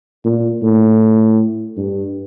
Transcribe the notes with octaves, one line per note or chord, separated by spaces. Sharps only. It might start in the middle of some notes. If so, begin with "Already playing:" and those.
A#2
A2
G2